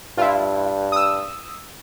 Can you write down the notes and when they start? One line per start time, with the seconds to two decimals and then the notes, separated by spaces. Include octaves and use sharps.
0.18 G2 E4 F4
0.92 D#6 E6